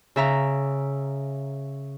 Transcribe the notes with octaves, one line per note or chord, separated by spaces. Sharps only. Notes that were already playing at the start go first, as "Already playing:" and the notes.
C#3 E5 A#5